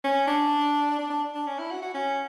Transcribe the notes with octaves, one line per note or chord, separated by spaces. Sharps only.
C#4
D4
D4
D4
D4
C#4
E4
F#4
F#4
C#4